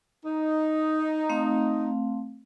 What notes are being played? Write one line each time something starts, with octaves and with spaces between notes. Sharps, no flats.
D#4
A3 C4 F5